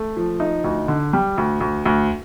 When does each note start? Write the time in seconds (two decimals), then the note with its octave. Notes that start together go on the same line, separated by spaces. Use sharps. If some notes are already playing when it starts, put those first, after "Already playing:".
Already playing: A3
0.17 F3
0.40 D#4
0.64 D2
0.88 D3
1.13 G3
1.38 D2
1.61 D2
1.86 D2